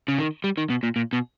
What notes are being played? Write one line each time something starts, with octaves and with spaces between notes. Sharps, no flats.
C#3
D#3
G3
D#3
B2
A#2
A#2
B2